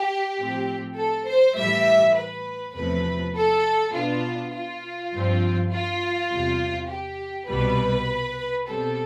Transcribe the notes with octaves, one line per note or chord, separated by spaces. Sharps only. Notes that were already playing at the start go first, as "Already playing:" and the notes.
Already playing: G4
A2 F3 C4
A4
C5
A2 E3 G3 E5
B4
E2 C3 F3 A3 B4
A4
B2 B3 D4 F4
F4
G2 F3 C4
F4
E2 C3 G3
G4
C2 B2 G3 B4
B2 G3 C4 A4